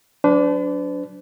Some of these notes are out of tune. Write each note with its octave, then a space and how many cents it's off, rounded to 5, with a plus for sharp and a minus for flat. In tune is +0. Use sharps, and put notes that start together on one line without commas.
F#3 +0 D4 -20 B4 +45